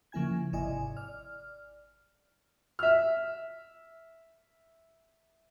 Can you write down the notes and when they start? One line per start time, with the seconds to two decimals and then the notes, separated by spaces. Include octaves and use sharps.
0.12 C#3 F3 A#3 E4 G#5 G#6
0.52 G#1 C3 E4 D5 D#5 G#5
0.97 D5 F6
2.79 E5 F6